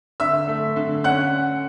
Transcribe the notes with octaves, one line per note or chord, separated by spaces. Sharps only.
D3 E5 E6
A3
D3
C#4 F#5 F#6